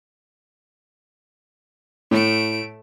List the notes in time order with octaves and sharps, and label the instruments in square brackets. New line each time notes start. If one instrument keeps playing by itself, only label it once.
[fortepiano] A2 [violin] A3 D7